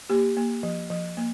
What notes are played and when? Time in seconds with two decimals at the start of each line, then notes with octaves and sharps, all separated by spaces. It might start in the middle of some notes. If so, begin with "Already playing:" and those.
0.10 A#3 G4
0.37 A#3
0.63 F3
0.90 F3
1.17 A#3